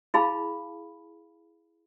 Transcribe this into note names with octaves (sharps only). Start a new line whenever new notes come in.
E4 G#4 F5 A5 B5